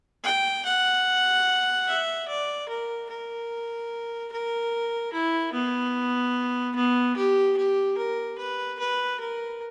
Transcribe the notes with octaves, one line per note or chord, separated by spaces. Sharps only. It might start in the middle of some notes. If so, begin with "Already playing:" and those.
G5
F#5
E5
D5
A#4
A#4
A#4
E4
B3
B3
G4
G4
A#4
B4
B4
A#4